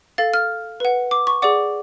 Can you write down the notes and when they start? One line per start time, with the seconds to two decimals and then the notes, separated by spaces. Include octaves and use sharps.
0.18 A4 F5 A6
0.34 F6
0.80 B4 F#5
1.11 D6
1.27 C#6
1.42 G#4 D5 F#5 D6